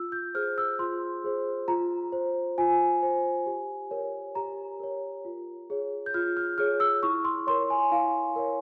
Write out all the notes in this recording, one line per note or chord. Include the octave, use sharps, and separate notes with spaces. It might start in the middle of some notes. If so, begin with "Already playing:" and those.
Already playing: F4 E6
G6
G#4 C5 F6
E6
F4 C6
G#4 C5
F4 A#5
C5
F4 G#5
C5
G4
A#4 C#5
G4 A#5
A#4 C#5
F4
G#4 C#5
G6
F4 F6
F6
G#4 C#5 F6
E6
E4 C#6
C6
A#4 C#5 C6
G#5
E4 F5
A#4 C#5